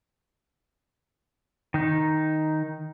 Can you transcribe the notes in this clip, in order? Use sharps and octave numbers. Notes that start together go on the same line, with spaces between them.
D#3 D#4